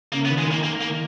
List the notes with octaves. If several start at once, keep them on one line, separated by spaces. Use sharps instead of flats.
C#3 A#3
B3
D#3
G#3
D#3
A#3
A#3
A#3
D#3